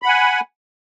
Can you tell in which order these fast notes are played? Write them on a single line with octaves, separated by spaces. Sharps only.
B5 F#5 G#5